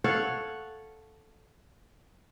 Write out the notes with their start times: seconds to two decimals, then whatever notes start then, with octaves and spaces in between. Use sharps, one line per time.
0.04 A4 C#5 F5 F#5